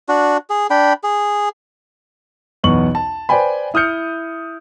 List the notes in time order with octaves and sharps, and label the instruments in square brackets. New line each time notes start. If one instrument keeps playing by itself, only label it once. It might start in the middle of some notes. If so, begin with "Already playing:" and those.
[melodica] D4 F#4
G#4
D4 G5 B5
G#4
[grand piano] B1 E2 B3 C#6 F#7
A5
B4 C5 D5 G5 G#5 B5
E4 D#6 F6 G6 C#7